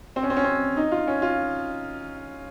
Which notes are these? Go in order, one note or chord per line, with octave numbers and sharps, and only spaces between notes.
C4
C#4
C4
C#4
C4
D#4
F4
C#4
F4